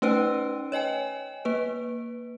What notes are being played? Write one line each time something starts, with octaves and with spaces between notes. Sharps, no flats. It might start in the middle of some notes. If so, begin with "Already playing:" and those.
A3 C#4 D#4 B4 C5 G5
C#5 D#5 G5 G#5
A#3 B4